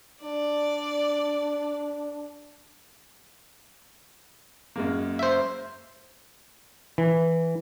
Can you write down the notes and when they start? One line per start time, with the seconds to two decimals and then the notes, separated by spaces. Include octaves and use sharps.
0.23 D4 D5
4.76 F#2 G#3 A#3
5.19 C5 E5
6.98 E3